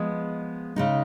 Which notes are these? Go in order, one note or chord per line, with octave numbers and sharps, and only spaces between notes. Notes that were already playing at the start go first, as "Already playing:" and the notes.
Already playing: F3 G#3 B3
C#3 G#3 D#4